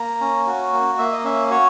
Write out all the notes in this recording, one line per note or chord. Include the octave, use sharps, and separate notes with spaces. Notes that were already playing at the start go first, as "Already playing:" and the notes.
Already playing: A#3 A#5
C#4
F#4
A#3
A#3 E5
D#5
C#4 E5
F#4 C#5